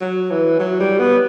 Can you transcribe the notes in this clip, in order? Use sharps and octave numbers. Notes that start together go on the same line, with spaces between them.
F#3
E3
F#3
G3
B3